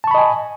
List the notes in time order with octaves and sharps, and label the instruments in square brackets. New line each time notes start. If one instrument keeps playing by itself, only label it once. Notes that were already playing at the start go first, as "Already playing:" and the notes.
[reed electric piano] A5
C#6
B5
D#5
G#5